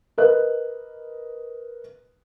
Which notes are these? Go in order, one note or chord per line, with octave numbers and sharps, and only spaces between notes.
A#4 B4 D#5 F#6